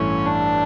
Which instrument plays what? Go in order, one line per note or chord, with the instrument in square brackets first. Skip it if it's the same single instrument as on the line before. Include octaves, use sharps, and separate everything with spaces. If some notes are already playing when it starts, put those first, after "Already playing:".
Already playing: [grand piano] A1 G2 E3 A3 E4 [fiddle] C#4
[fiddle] D4